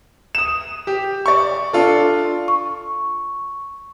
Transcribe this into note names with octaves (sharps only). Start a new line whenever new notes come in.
D#6 E7
G4
D5 C#6
D4 F4 A4
C#6